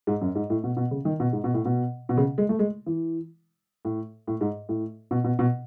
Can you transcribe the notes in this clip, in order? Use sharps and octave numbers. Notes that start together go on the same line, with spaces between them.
G#2
F#2
G#2
A2
B2
B2
C#3
D#3
B2
G#2
B2
A2
B2
B2
C#3
G#3
A3
G#3
E3
A2
A2
G#2
A2
B2
B2
B2